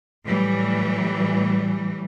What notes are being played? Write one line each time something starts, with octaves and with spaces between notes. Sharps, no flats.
A2 E3 F#3 G3